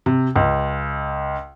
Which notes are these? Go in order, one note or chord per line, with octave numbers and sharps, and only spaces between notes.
C3
C#2